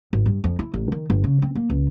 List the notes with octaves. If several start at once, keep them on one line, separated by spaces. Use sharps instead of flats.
G#1
G2
F2
E4
A1
D#3
G1
C#3
C4
A#3
C#2